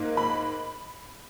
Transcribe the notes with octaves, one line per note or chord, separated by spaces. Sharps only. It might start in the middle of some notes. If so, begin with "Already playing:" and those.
Already playing: G#2 A#3
B5